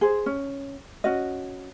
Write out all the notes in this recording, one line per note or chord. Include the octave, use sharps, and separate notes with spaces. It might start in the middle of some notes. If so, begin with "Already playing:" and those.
G#4 C5
C#4
C#4 F#4 D#5